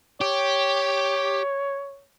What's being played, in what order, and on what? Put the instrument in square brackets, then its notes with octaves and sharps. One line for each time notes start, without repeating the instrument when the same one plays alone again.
[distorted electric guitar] G4 [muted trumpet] C#5